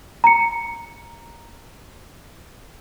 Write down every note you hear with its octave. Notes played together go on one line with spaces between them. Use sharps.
A#5 C#7